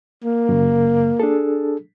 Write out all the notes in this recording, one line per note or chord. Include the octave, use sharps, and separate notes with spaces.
A#3
F#2 C#3
D4 G#4 A4